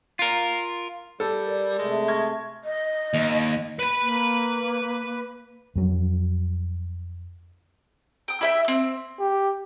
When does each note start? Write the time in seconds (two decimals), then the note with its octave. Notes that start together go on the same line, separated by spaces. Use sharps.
0.19 F4 A#4
1.20 G3 A4
1.46 A#4 D5
1.79 C3 G#3 A3
2.08 C#6 F6 G#6 A#6
2.63 D#5
3.14 D#2
3.79 B4 B5
4.02 A#3
5.76 F2 F#3
8.28 G5 D#6
8.41 E4 E5 G5
8.65 C4 E6
9.20 G4